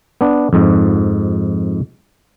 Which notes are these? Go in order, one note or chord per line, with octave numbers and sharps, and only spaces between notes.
B3 D4
F2 G#2